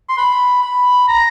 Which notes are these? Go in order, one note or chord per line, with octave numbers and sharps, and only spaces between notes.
C6
B5
B5
A#5